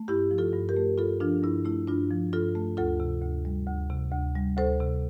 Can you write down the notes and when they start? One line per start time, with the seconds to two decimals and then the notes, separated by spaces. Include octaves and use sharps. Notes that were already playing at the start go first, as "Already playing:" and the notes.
Already playing: A3
0.08 G2 E4 G4
0.31 F3
0.38 F4 A4
0.53 G2
0.69 G4 A#4
0.76 A3
0.98 G2 F4 A4
1.20 F3 D4 F4
1.43 G2 E4
1.65 A3 E4
1.87 G2 D4 F4
2.11 F3
2.33 G2 F4 A4
2.56 A3
2.77 D2 F4 A4
3.00 C3
3.22 D2
3.45 G3
3.67 D2
3.90 C3
4.12 D2
4.35 G3
4.57 D2 A4 C5
4.80 C3